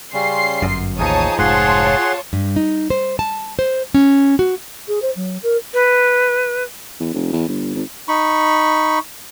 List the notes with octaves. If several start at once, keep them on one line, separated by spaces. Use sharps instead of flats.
C#3 G3 C#4 C6 C7
G1 F#2
A1 D#2 F3 D#4 G#4 C#5 A5 D#6
F1 G#2 F4 G#4 C#5 F#5 A5 C6
G2
D#4
C5
A5
C5
C#4
F#4
G#4
C5
F#3
A#4
B4
E2
F1
E2
G1
G#1
D#4 B5 C#6